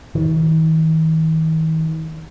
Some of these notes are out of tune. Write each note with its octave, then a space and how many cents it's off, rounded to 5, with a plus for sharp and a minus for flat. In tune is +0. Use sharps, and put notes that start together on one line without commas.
D#3 +45